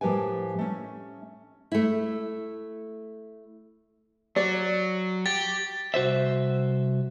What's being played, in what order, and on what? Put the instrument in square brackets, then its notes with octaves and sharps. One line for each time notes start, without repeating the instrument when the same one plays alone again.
[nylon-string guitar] A2 F3 G4 A#4 B4 G#5
A3 C#4
A3 E4
[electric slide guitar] F#3 [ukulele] D5
[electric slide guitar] G4 [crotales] A6
[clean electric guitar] C2 F#4 C5 E5